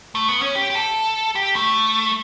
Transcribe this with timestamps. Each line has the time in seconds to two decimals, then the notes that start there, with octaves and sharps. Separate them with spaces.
0.15 A3
0.29 B3
0.42 C#4
0.55 G4
0.70 G4
0.75 A4
1.35 G4
1.56 A3